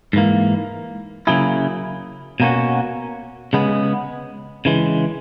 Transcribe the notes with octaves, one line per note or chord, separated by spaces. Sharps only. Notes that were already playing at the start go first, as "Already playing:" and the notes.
G#2 E3 A#3
C#3 F#3 A#3 E4 G#4
B2 A#3 C#4 F#4
C#3 G#3 B3
C#3 E3 G#3